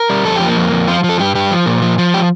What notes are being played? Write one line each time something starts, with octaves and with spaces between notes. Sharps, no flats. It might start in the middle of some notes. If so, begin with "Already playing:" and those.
Already playing: A#4
G3
F2 A4
G4
F3 A#3
F2
F2
F3 F4
F3
A4
G2 G4
G2 G4
F3
A#2
F3
F3
G4